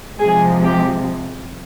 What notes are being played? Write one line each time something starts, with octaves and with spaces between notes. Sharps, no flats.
C3 F3 G#3 G#4
G4